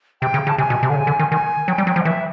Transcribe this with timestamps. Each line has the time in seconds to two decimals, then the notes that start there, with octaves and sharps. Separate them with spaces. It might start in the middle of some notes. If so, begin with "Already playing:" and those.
0.22 C3 G5
0.34 C#3
0.47 C#3 A5
0.58 C3 G#5
0.70 B2
0.83 C3
0.90 D3
0.95 C#3
1.07 D3
1.19 D#3
1.32 D#3 G#5
1.68 F#3 G5
1.78 G3
1.87 F#3
1.96 F3
2.01 D#5
2.05 E3 E5